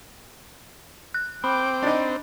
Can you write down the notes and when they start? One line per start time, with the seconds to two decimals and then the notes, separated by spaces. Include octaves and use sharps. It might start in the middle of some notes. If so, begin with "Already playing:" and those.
1.14 F#6
1.44 C4 G5 B5 D6
1.83 D4 D#4